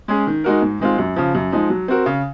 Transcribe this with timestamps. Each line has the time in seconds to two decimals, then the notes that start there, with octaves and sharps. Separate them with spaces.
0.08 G#3 C#4 G#4
0.27 D#3
0.44 G#3 D#4 F#4 A#4
0.62 G#2
0.80 D#3 G#3 C4 F4
0.98 F#2
1.16 C#3 F3
1.35 F#2
1.52 F3 G#3 D#4
1.70 F#3
1.88 C4 F#4 A#4
2.06 C#3